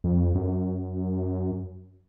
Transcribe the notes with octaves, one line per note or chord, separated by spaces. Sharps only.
F2
F#2